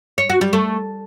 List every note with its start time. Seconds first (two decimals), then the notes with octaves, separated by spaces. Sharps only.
0.18 C#5
0.30 F#4
0.41 G3
0.53 A3